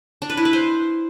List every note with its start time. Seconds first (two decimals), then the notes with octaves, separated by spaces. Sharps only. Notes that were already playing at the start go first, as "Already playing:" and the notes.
0.22 D4
0.30 B4
0.37 E4
0.45 B4
0.53 C5